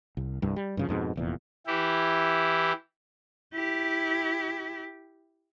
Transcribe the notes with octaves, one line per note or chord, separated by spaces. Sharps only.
C2
C2 G2
G3
G2 C#3 F3
F2 G#2 B2
F1 E2 A#2
E3 E4 G4
E4 G4